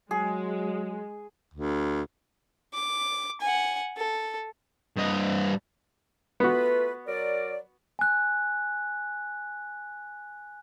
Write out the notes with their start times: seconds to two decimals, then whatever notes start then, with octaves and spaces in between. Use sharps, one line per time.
0.11 F#3 G#3 G#4
1.54 D2
2.74 D6
3.41 F#5 G#5
3.97 A4
4.96 G2 D#5
6.40 A3 B3 F4 F#4 B4
7.06 F#3 A#4 D5
7.99 G#5 F#6